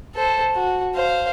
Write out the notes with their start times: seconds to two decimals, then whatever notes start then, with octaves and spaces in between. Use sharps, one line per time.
0.15 A4 C5
0.55 F#4
0.96 C5 F5